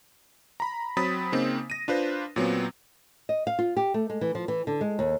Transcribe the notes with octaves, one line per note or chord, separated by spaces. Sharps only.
A#5 B5
F#3 C4 B5 D#6 A6 B6
C#3 A#3 C4 D#4
A#6 D#7
D4 F4 B4 C5
A#2 F#3 B3 C4
D#5
F5
F4
G4
A3
G#3
E3
F3
E3
D3
G#3
D#2